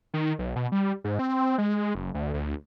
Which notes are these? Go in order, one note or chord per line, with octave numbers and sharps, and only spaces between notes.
D#3
B1
B2
G3
G#2
C4
G#3
F#1
D2
D2